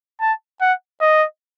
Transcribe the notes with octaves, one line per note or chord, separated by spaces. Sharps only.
A5
F#5
D#5